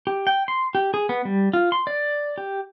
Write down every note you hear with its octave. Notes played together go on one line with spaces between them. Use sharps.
G4
G5
C6
G4
G#4
B3
G3
F4
C6
D5
G4